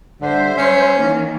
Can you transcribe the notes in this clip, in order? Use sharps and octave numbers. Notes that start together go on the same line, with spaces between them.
D3 G3 C5 E5
C#4
D#3 E3 A#3